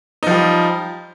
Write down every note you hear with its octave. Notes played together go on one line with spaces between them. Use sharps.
F3 G3 D#4